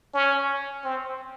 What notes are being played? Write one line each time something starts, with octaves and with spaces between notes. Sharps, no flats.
C#4
C4